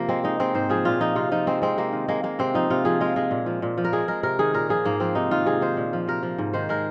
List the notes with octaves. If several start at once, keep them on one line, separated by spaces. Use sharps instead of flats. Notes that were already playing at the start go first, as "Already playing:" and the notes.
Already playing: C3 F3 A#3
G#3 C4
G#3 D#4
G#3 C4
G#2 C5
F3 G#4
A#2 F4
F3 D#4
C3 F4
F3 D#4
G#3 C4
G#3 C4
C3 A#3
D#3
G#3 A#3
G#3 A#3
C3 C4
F3 D#4
C3 F4
F3 G#4
G#3 F4
G#3 G#4
A#2
F3
A#2
F3
A#4
G#3 G#4
G#3 A#4
C3 A#4
D#3 G#4
A#2 A#4
F3 G#4
G#2 A#3
F3 C4
C3 D#4
D#3 F4
C3 G#4
D#3 C5
A#2
F3
C3 A#4
F3
G#2
D#3 C5
G#3 A#4